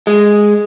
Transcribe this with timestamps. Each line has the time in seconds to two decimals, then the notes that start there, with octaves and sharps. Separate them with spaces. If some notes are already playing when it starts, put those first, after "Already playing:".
0.07 G#3